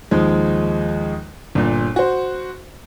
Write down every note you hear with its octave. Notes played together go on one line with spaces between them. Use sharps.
D#2 F3 G#3
G1 A#2
F#4 C5